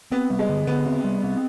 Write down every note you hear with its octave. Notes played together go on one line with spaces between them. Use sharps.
B3 C4
G3
G#3
D3
D3 B3
C4
G3
C4